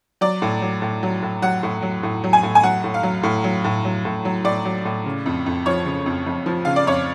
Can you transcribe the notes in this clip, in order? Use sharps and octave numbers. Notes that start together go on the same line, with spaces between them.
F#3 D5
A2
F#3
A2
F#3
A2
F#3 F#5
A2
F#3
A2
F#3
G#5
A2
G#5
F#3 F#5
A2
F5
F#3
A2
F#3
A2
F#3
A2
F#3
A2 D5
F#3
A2
C#3
F2
F2
F3 C#5
C#3
F2
F2
F3
C#3 F5
D5
F2 C#5